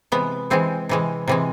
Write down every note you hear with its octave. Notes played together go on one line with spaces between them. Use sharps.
C3 E3 G#3 B3
C3 E3 G#3 C4
C3 E3 G#3
C3 E3 G#3